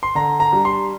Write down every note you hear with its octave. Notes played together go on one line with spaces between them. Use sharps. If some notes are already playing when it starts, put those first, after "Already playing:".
C6
D3 A#5
A#5
G3 D4
C6